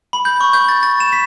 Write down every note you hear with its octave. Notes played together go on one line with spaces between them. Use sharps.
B5
G6
C#6
G6
A6
A6
E7
B6